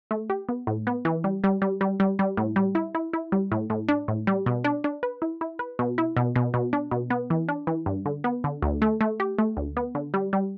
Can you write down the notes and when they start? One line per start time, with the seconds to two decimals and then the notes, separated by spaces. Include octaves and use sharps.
0.11 A3
0.30 G4
0.49 B3
0.67 A2
0.87 B3
1.05 E3
1.24 G3
1.44 G3
1.62 G3
1.81 G3
2.00 G3
2.19 G3
2.37 A2
2.56 G3
2.75 E4
2.95 E4
3.13 E4
3.32 G3
3.52 A2
3.70 A2
3.89 D4
4.08 A2
4.27 G3
4.46 B2
4.64 D4
4.84 D4
5.03 B4
5.22 E4
5.41 E4
5.59 B4
5.79 B2
5.98 E4
6.17 B2
6.36 B2
6.54 B2
6.73 D4
6.91 B2
7.10 B3
7.30 E3
7.49 D4
7.67 E3
7.86 G2
8.06 D3
8.24 B3
8.44 D3
8.62 D2
8.82 A3
9.01 A3
9.20 G4
9.39 A3
9.57 D2
9.77 B3
9.95 D3
10.14 G3
10.33 G3